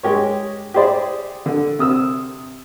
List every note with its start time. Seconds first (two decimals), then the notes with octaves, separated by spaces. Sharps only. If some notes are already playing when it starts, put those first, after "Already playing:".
0.03 G#3 G4 C#5
0.74 G4 G#4 C5 D5
1.46 D3
1.79 C3 D#6 E6